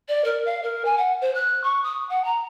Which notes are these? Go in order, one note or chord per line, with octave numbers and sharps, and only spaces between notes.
D5
A#4
F5
A#4
G#5
F#5
C5
F#6
C#6
D#6
F#5
A#5